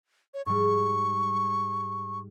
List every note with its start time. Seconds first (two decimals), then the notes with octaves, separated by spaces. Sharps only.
0.34 C#5
0.46 G#2 G3 C#6